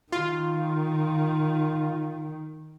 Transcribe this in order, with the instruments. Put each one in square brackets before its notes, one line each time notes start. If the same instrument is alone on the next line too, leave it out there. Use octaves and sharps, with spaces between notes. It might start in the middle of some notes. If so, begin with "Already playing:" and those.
[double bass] D#3 [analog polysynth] F4